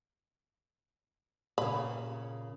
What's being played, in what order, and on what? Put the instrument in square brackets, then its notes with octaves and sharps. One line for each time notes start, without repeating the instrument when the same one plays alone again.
[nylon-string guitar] A#2 C#3 [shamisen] B5